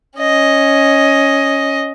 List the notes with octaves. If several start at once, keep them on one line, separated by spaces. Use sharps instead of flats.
C#4 D#5